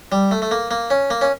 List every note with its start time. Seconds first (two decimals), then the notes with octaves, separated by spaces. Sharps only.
0.12 G3
0.31 A3
0.42 A3
0.51 A#3
0.71 A#3
0.90 C#4
1.10 A#3
1.21 C#4